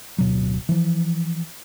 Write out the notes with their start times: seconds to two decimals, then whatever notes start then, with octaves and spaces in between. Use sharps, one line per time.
0.18 D1 B2 F#3
0.69 E3 F3